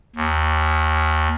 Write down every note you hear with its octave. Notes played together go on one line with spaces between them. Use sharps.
D#2